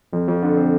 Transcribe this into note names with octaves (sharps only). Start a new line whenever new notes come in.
F2
F2
D3
C4